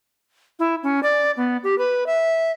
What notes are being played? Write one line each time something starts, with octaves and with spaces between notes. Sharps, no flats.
E4
C#4
D5
B3
G4
B4
E5